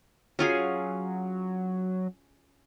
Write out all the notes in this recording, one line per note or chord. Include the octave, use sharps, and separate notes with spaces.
F#3 C#4 F4 G#4